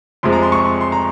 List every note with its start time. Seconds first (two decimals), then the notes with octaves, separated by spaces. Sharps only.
0.23 F2 C3 F3 G#3 C6
0.33 A#5
0.43 C6
0.52 C#6
0.81 C6
0.92 A#5